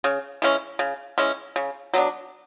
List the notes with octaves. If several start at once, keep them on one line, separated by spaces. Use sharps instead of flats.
C#3
E3 G#3 C#4
C#3
E3 G#3 C#4
C#3
F#3 B3 D4